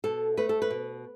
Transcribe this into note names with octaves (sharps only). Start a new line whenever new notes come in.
B2 A4
A3 B4
A4
B4
B2